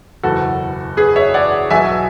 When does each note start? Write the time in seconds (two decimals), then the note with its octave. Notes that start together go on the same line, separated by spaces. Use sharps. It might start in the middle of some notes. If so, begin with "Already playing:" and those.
0.23 F#1 E2 B2 F#3 F#4 A4
0.97 G#4 B4
1.16 C#5 E5
1.34 D5 F#5
1.70 B1 B2 F#3 E5 G#5